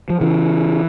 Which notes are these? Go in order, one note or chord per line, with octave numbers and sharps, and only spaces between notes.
F3
C#3 E3